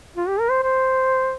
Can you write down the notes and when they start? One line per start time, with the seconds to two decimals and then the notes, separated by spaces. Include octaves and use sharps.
0.17 F4
0.28 G4
0.40 A#4
0.50 C5
0.63 C5